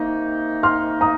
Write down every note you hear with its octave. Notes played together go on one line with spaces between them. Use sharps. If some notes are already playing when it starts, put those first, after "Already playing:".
Already playing: C3 D#3 A#3 D#4
C6 F6
A#5 D#6